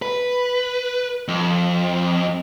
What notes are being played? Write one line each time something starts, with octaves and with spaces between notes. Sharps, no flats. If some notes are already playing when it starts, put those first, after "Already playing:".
B4
F2